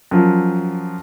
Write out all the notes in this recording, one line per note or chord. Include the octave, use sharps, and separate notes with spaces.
F#2 F3